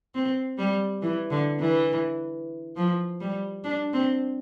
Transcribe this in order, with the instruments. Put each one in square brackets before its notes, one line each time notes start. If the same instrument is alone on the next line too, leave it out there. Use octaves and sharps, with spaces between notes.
[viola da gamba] C4
G3
E3
D3
E3
F3
G3
D4
C4